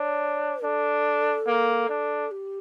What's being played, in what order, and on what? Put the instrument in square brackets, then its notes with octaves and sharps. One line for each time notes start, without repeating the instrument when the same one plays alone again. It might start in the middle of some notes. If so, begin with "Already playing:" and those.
Already playing: [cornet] D4 [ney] C#5
[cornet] D4 [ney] A4
[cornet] A#3
D4
[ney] G4